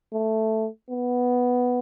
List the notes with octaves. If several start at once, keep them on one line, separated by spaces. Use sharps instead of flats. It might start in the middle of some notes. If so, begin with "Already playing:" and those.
A3
B3